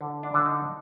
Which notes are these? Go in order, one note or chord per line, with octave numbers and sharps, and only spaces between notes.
D3
D4
D3
D#4